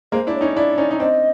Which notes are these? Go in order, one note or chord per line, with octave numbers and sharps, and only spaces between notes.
G#3 A#3 C5
D4 E4
C#5
C#4 D#4
D4 E4 D5
C#4 D#4
D#4
C4 D4 D#5